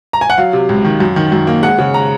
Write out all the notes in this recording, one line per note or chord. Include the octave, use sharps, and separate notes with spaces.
A#5
G#5
F#5
F#3 F5
C3
C#2
D#3
F#2
D#3
F#2
A#3
G#3 F#5
C#3
A#5